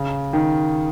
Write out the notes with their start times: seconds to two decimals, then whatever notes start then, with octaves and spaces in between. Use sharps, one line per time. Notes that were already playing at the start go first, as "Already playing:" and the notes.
Already playing: C#3
0.33 D#3